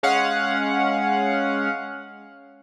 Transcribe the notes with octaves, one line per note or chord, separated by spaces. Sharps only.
G#3 C#4 F5 F#5